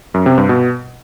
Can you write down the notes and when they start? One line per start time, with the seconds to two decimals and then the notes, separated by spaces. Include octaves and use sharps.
0.14 F#2
0.26 C3
0.38 G2
0.49 B2